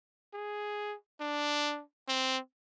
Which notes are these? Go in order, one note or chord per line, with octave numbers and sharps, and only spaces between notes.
G#4
D4
C4